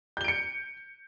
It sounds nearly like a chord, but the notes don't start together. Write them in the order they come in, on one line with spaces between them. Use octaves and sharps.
G6 G7 D7 C#7